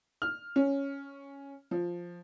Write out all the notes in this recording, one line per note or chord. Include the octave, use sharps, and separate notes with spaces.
F6
C#4
F3